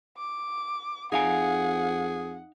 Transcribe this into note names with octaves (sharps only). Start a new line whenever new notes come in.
D6
F2 D#4 G#4 F5 F#5 G#5